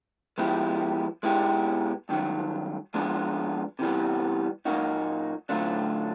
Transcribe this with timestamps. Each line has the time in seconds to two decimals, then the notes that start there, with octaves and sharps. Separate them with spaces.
0.38 F3 G#3 B3 E4 G4
1.23 B2 G#3 B3 E4 G4
2.09 G2 D#3 F#3
2.94 F3 G#3 B3 D4
3.79 C3 E3 G3 B3
4.65 A#2 F#3 A#3 D#4 F#4
5.49 D3 F#3 A3 D4 F4